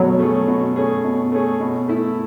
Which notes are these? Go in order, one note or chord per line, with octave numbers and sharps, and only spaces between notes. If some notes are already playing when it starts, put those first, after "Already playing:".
Already playing: B2 F#3 A3 C#4 G#4
A3 C#4 G#4
B2
A3 C#4 G#4
B2
A3 C#4 G#4
B2
A3 E4